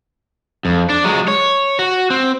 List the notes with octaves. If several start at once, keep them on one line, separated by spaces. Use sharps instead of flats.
F2
D4
F#3 G#3
C#5
F#4
C4